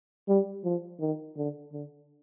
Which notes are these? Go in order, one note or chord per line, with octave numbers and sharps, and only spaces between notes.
G3
F3
D#3
D3
D3